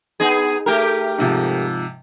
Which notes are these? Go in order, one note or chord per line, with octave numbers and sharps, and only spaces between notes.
B3 D#4 G#4
A3 G4 A#4
G#2 C3 F3